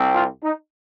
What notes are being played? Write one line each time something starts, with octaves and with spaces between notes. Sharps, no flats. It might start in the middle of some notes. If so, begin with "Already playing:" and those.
Already playing: C2 C4
F4
D#4